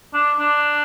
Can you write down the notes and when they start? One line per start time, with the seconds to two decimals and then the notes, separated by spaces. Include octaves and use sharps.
0.14 D4
0.39 D4